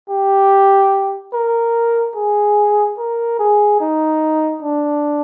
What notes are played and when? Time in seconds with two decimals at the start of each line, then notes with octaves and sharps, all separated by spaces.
0.10 G4
1.33 A#4
2.16 G#4
2.98 A#4
3.39 G#4
3.80 D#4
4.62 D4